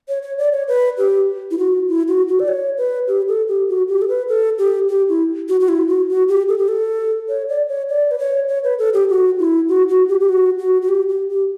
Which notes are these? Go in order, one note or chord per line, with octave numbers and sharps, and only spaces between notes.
C#5
C#5
D5
C#5
B4
G4
E4
F#4
E4
F#4
F#4
D5
C#5
B4
G4
A4
G4
F#4
G4
A4
B4
A4
G4
G4
E4
F#4
F#4
E4
F#4
F#4
G4
A4
G4
A4
C#5
D5
C#5
D5
B4
C#5
C#5
B4
A4
G4
F#4
E4
F#4
F#4
G4
G4
F#4
F#4
F#4
G4
G4
G4